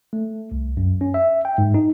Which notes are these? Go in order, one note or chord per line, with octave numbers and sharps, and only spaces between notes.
A3
C2
F#2
C#4
E5
G5
G#2
D#4